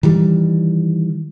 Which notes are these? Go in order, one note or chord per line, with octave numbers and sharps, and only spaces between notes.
D#3 E3 G3